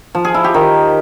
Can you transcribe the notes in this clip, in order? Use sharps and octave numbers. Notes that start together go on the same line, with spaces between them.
F3
G#4
E4
G4
D#3